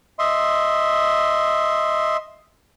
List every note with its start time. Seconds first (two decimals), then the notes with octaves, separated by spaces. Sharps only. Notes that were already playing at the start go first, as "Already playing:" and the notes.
0.19 D#5 E5 C6